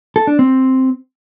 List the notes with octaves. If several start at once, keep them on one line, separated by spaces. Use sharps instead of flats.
A4
D4
C4